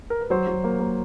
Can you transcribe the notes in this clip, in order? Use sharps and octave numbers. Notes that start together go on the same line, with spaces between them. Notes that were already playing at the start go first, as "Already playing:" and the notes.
A#4
B4
F#3 C5
F#3
A#3
A#3